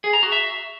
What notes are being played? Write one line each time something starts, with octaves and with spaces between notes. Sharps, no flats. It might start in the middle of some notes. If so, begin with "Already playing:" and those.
G#4
A#5
F#4
E5